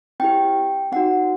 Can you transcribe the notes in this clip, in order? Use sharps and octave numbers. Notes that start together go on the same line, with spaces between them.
C4 E4 G4 G5
C4 D#4 F#4 F#5